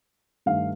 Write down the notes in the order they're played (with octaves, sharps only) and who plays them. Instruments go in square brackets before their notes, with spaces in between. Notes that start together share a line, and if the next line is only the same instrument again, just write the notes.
[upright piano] G2 D#3 A3 F5